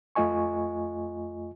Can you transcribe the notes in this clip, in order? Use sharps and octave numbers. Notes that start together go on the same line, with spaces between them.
F2 A3 F4 D#5 G#5 C#6